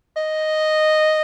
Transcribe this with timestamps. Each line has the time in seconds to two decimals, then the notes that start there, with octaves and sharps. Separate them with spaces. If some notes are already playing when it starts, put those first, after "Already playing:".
0.17 D#5